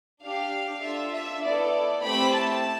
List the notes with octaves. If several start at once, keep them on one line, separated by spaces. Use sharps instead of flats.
D4 G4 F5
D4 F4 A4 E5
E5
B3 E4 A4 D5
A3 C4 E4 G4 B5
A5